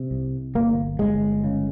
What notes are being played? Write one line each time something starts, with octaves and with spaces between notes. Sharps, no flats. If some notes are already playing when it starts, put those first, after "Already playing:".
Already playing: C3
C2
G1 A#3
G1 G#3
C#3